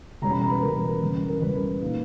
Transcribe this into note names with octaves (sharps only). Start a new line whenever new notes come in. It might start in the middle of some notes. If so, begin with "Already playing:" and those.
E2 B2 G3 C#4 A#5
B5
A#5
B4
E2 B2 G3 C#4 A#4
E2 C#3 G3
A#4
E2 C#3 G3 B4
A#2 A#3 D#4